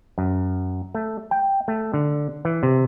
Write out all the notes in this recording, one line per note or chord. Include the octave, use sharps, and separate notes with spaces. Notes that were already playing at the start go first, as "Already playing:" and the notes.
F#2
A3
G5
A3
D3
E3
C3